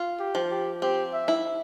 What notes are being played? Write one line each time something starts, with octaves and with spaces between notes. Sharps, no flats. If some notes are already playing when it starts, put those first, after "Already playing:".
Already playing: F4
G4
F3
G4
C4 G4
E5
E4